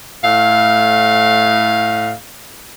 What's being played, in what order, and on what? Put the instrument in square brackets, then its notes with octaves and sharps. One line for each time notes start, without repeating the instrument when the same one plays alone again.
[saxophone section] A2 F5